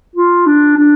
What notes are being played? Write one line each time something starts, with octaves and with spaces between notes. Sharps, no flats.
F4
D4
D4